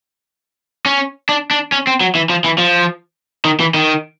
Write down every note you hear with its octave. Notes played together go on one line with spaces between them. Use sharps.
C#4
D4
D4
C#4
C4
F#3
E3
F3
E3
F3
D#3
E3
D#3